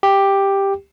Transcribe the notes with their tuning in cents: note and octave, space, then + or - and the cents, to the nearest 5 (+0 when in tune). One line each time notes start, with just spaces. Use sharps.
G4 +5